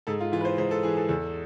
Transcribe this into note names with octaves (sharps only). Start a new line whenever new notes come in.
G#2 A4
F4
E3 F4
B4
C5
G#2 C5
A4
E3 G#4
A4
E2 A4